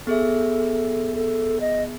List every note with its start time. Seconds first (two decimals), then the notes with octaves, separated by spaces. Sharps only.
0.07 B3 G#4 A4 E5
1.15 A4
1.61 D#5